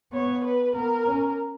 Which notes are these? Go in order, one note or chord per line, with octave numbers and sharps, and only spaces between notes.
B3 C#5
B4
B3 A#4
C#4